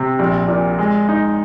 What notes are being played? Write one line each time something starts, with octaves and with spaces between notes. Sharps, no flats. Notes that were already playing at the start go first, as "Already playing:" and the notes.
Already playing: C3
A#1
A#2
G#3
D#4